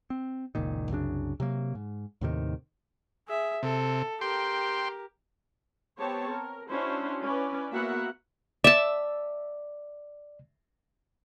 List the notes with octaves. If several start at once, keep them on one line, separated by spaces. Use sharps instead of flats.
C4
F#1 C#2 A#2 D#3
C2 F#2 C#3 D4
C3 F#3 A#3
G#2
D#2 A2 C3 D#3
G#4 E5
C3 A4
G4 A#4 G5 C6
B3 C4 G4 C#5 A5
A#4
C#4 D4 E4 F#4 C5
C#4 E4 B4 D5
A#3 B3 F#4 A#4 E5 F#5
D5 E5 A5